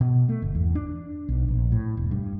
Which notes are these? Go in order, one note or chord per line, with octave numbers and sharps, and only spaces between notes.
B2
A3
G1
E2
D4
B1
A#1
A2
E1
G2